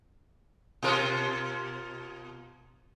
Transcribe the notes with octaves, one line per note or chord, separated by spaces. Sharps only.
B2 F4 A#4